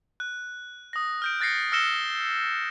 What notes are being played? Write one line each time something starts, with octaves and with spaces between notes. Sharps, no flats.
F#6
D#6 A#6
F6 G6 D7
F#6 A6 A#6 C7 C#7
E6 F6 A#6 C#7 E7 G7